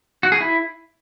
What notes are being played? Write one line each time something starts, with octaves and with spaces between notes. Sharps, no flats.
F#4
G#4
E4